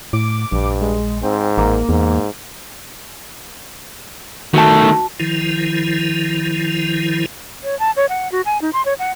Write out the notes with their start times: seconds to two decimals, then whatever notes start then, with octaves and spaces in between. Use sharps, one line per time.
0.13 A2 D6
0.52 A#1 G2
0.81 G#3
1.23 G#2 C4
1.58 A1 A#3
1.89 E2 G#2
4.54 D#3 A3 F#4 A5
5.20 D#3 F3 E4
7.64 C#5
7.79 A5
7.96 C#5
8.09 F#5
8.32 F#4
8.45 G#5
8.62 D#4
8.73 C6
8.85 C#5
8.99 F#5